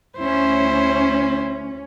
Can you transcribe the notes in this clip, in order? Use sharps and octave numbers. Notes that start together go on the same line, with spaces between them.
D2 C#4 E4 C5